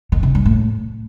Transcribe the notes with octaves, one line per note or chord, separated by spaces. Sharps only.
D#3
C3
G2
A2